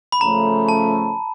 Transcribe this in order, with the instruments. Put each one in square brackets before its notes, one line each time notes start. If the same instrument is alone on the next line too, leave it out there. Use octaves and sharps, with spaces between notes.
[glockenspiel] B5
[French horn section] C#3 F3 A3 C#4 [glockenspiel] A#5
[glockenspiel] A5